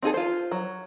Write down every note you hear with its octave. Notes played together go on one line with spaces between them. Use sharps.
C4 D#4 G#4 A4
F4 C5
F#3